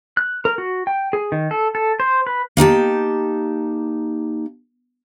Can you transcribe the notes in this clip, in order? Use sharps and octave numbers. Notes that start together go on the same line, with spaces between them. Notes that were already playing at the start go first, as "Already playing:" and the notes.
F#6
A#4
F#4
G5
G#4
D#3
A4
A4
C5
B4
A#3 D#4 G4 A5